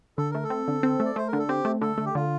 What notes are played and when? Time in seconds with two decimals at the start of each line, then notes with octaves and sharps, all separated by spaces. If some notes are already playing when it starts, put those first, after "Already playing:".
0.18 D3 A4
0.31 A3 A#4
0.44 A4
0.50 C4
0.68 D3
0.83 C4
1.00 A3
1.05 D5
1.16 A3 C5
1.28 A#4
1.33 D3
1.39 A4
1.49 C4 G4
1.65 A3
1.81 D3 A4
1.98 A3
2.06 G4
2.15 D3 F4